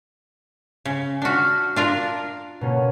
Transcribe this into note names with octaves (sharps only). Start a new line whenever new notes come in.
C#3
D4 F#4 F6 B6 C7
D4 F4 A#4
B2 A#3 C#4